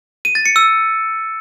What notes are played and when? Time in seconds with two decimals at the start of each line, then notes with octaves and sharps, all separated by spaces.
0.25 D#7
0.35 A6
0.46 C#7
0.56 E6